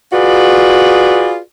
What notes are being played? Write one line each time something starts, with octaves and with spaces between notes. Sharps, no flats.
F4 F#4 G#4 B4 D5